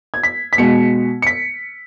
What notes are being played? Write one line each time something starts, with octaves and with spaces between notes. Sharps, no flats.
G#6
B6
B6
B2 G#3 C#7
C#7
B6